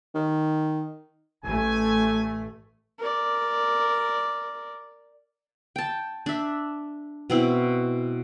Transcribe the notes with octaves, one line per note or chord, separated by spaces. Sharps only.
D#3
A1 A3 G#5
A#4 D5
G5 A5
D4 E5
B2 C4 E4